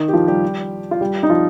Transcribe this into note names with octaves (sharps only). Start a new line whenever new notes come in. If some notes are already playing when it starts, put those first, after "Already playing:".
Already playing: D#3 D#4
G4
F3 F4
G3 G4
F4
G3 G4
D#4
F3 F4